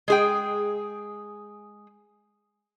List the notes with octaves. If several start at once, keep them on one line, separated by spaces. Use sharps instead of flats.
G#3 G#4 G5